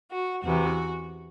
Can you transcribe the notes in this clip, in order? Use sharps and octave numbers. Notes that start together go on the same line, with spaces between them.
F#4
E2 C3 E3 F#4